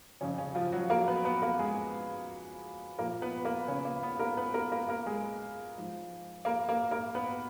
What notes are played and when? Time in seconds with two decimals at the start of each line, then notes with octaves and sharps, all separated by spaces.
0.21 F2 C#3 F3 C#4
0.38 C#3 C#4
0.55 F3 F4
0.72 F#3 F#4
0.90 A#3 A#4
1.08 B3 B4
1.25 B3 B4
1.42 A#3 A#4
1.59 G#3 G#4
2.99 A#2 F3 A#3 A#4
3.22 B3 B4
3.45 A#3 A#4
3.68 C#3 C#4
3.85 A#3
4.03 B3
4.19 A#3 A#4
4.37 B3 B4
4.54 A#3 A#4
4.72 A#3 A#4
4.89 A#3 A#4
5.06 G#3 G#4
5.76 G#2 F3
6.45 A#3 A#4
6.69 A#3 A#4
6.91 A#3 A#4
7.15 B3 B4